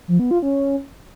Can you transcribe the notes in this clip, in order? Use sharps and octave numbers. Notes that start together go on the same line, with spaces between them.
F3
B3
F4
C#4